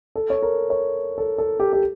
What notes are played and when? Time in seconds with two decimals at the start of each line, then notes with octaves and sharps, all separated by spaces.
0.16 A4
0.30 C#5
0.42 A#4
0.70 C#5
1.18 A4
1.38 A4
1.60 G4
1.73 G4